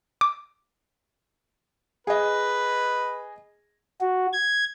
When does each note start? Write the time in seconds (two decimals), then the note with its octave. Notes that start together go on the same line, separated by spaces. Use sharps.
0.21 D6
2.07 G#4 B4 D#5
4.01 F#4
4.33 G#6